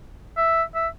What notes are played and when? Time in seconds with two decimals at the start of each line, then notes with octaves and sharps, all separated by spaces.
0.37 E5
0.75 E5